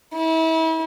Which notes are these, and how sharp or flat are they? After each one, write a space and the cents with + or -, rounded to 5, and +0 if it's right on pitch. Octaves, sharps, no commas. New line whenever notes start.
E4 -35